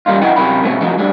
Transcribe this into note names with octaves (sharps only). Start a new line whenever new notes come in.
F#2 G3 A#3 D#4 F4
D#4 E4 D#5 F#5 G5
F#2 C3 F#3 A#4 G5 B5
G#2 B2 G#3 A3 C4 C#4
F3 F#3 A3 D#4
G3 A3 D4